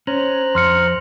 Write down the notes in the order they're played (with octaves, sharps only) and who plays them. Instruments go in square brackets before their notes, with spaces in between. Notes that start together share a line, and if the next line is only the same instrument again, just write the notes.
[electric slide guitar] C#4 [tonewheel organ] C5 A#5 F#6
[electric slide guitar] F2 [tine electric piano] C6 F6 C#7